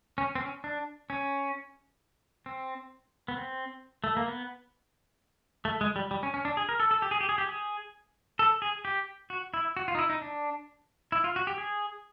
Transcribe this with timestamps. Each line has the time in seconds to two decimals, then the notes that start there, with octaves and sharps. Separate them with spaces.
0.18 C#4
0.35 C4
0.41 C#4
0.64 D4
1.10 C#4
2.46 C4
3.28 B3
3.37 C4
4.04 A3
4.17 A#3
4.28 B3
5.65 A3
5.81 G#3
5.96 G3
6.11 G3
6.23 C#4
6.34 C#4
6.45 D4
6.57 G#4
6.69 A#4
6.80 A4
6.91 A4
7.02 G4
7.11 G#4
7.21 G4
7.29 G#4
7.38 G4
7.48 G#4
8.39 A4
8.62 G#4
8.85 G4
9.30 F#4
9.54 E4
9.77 F#4
9.88 F4
9.95 D#4
9.98 E4
10.10 D#4
10.22 D4
11.12 E4
11.24 F4
11.36 F#4
11.47 G4
11.58 G#4